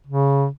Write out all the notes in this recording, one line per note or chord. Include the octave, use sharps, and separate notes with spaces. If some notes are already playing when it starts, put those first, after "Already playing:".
C#3